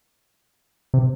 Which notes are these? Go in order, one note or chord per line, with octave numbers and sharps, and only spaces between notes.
C3